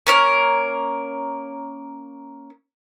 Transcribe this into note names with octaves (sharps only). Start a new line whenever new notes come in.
A#3 C#4 A#4